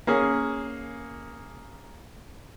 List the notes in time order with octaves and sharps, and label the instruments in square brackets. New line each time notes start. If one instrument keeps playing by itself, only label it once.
[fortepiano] A#3 C#4 G#4